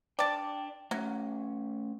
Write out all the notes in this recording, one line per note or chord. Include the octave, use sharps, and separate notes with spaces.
D4 D5 G5 A5
F#3 A3 C#4